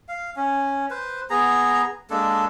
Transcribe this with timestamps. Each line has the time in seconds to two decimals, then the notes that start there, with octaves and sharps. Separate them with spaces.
0.08 F5
0.36 C#4
0.90 B4 C5
1.30 B3 G#4 A#5
2.10 G#3 A#3 D4 A4